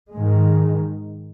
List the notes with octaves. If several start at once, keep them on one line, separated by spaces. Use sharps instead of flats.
G#2 D#3 G#3